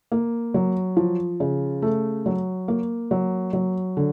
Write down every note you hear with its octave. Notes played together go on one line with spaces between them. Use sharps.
A#3
F#3
F3
C#3
A3
F#3
A#3
F#3
F#3
D3